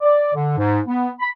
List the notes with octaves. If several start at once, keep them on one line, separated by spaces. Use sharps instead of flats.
D5
D3
G#2
B3
B5